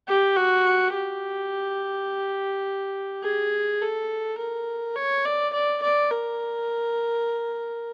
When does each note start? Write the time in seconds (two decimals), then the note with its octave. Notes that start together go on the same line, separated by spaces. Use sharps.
0.08 G4
0.36 F#4
0.94 G4
3.23 G#4
3.81 A4
4.38 A#4
4.96 C#5
5.25 D5
5.53 D5
5.82 D5
6.10 A#4